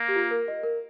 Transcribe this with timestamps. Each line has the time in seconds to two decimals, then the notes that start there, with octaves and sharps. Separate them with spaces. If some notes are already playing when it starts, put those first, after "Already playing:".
Already playing: A#3
0.08 G4
0.16 F4
0.31 A#4
0.48 D#5
0.63 A#4